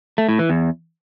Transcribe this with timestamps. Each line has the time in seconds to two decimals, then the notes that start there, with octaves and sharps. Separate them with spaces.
0.18 A3
0.29 A2
0.39 E3
0.50 E2